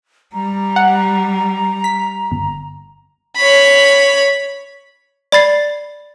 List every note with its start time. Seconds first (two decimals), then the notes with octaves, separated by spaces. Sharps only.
0.33 G3 A#5
0.76 F#5
1.84 B6
2.31 G1
3.36 C#5 B5
5.32 D5 B5 A6 C7